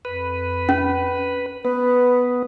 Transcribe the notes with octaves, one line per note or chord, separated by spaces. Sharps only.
F2 B4
C#4
B3 B4